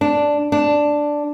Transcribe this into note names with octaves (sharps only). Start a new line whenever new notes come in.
D4
D4